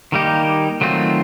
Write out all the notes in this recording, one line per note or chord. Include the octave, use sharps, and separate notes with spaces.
D#3 G3 A#3 D#4 G4
D#3 F#3 A3 C4 F4